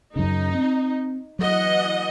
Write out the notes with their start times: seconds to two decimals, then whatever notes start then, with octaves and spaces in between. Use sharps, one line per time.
0.16 F#2 C#3 D#4
0.55 C4
1.39 E3 F#3 D#5 F#5